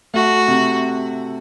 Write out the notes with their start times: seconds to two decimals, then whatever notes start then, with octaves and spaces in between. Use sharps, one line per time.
0.14 A3 F#4
0.48 C3